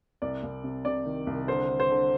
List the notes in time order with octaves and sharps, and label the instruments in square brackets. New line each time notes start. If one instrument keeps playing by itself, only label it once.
[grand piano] C2 D5
C2
C3
C3 D5
D#3
C2
D3 C5
D3
C5
D3